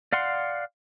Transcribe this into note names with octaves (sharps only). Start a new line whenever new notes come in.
D5 F5 F#5 C6